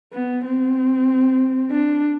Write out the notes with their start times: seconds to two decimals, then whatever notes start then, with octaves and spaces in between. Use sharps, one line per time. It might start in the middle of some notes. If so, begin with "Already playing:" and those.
0.13 B3
0.45 C4
1.71 D4